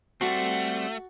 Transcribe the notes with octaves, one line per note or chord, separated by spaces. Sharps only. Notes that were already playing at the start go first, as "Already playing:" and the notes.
G3 A3 C4 F#4 A4 F#5